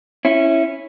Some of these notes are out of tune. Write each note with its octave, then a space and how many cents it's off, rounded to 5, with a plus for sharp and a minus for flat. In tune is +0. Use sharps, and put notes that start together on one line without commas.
C#4 -15 E4 +0